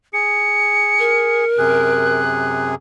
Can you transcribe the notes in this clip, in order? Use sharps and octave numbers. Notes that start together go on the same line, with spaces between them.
G#4 C#7
A#4
F#2 C3 G#4 F#6